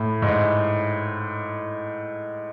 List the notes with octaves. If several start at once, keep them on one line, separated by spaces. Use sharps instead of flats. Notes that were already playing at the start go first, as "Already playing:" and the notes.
Already playing: A2
G#2